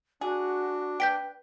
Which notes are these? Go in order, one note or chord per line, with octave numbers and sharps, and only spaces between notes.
D4 F#4 G#4
B4 G5 G6 B6 D7